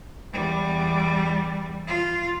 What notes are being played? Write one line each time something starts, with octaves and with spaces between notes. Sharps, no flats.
E2 G3
F4